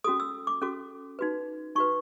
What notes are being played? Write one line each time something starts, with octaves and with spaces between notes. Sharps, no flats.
C#4 F#4 A4 D#6
E6
D6
C#4 F#4 A4 D6
D#4 F#4 B4
D#4 F#4 B4 C#6